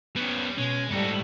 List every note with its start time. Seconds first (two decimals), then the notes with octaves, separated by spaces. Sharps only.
0.16 G3 B3 C#4 C#5
0.58 B2 G#3 C#4
0.91 G#2 G3 A3 F#4 A4